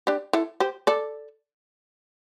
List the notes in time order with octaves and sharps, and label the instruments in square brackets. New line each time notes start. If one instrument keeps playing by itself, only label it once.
[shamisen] D4 G4
E4 A4
G4 C5
A4 D5